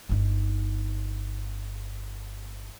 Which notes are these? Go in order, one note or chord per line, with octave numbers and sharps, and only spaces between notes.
G1 D#4